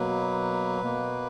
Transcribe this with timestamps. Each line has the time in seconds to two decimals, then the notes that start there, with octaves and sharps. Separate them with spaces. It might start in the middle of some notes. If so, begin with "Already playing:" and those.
Already playing: B2 F#3 A#3 B4
0.81 B2 A#3